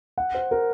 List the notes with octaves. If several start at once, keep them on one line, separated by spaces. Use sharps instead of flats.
F#5
C5
A#4